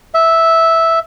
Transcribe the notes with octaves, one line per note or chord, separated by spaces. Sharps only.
E5